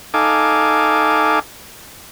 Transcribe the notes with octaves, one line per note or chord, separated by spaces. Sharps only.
D#4 A4 F5 G#5 D6